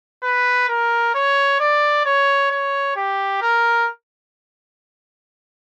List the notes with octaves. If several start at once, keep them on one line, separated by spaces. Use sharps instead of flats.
B4
A#4
C#5
D5
C#5
C#5
G4
A#4